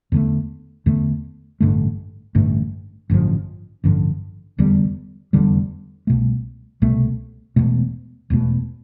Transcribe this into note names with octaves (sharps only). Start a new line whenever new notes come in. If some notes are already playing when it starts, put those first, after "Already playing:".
E2 D3 A3
E2 D3 A3
A1 G2 D3 A3
A1 G2 D3 A3
A1 G2 D3 F3
A1 G2 D3 F3
F1 E2 D3 G3
F1 E2 D3 G3
C2 B2 A3
C2 B2 A3
E1 E2 B2 A3
E1 E2 B2 A3